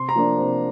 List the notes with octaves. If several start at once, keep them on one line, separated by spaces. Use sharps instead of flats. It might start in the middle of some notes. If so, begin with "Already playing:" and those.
Already playing: C3 C6
A#5
F3 A#3 D4
C3